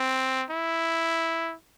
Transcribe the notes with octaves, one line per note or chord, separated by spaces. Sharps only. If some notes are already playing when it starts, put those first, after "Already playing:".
Already playing: C4
E4